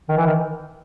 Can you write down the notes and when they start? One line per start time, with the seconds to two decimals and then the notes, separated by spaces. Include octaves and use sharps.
0.09 D#3
0.17 E3
0.26 D#3